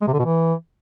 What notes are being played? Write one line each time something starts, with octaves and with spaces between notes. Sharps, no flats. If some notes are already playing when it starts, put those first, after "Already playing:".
G#3
C3
D3
B2
E3